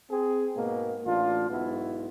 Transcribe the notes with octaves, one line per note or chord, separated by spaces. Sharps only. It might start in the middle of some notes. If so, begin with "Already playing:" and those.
C4 G#4
G#2 B2 A#3
A1 D4 F4
B1 G#2 B3 E4 F#4